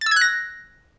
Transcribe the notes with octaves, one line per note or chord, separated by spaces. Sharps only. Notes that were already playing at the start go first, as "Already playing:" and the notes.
A6
E6
G#6
F#6
A#6